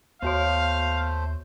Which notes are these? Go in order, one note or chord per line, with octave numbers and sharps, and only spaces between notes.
D#2 A3 B3 F#4 C5 C#5 F5